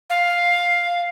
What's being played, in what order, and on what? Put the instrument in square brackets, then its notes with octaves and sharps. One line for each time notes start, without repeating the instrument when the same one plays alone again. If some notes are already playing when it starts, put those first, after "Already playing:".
[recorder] F5